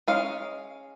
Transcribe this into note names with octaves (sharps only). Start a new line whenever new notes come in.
G#3 C#4 F5